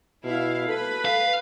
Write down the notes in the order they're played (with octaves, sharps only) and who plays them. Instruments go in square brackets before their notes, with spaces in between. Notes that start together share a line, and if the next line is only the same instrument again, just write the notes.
[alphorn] B2 [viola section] E4 F5
[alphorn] A4 [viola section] B4 B5
[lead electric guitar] F5